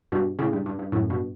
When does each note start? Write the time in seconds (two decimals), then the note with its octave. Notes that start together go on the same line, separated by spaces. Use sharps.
0.12 G2 B2
0.39 A2 C#3
0.53 G2
0.66 G2
0.79 G2
0.92 F#2 A2
1.10 G2 B2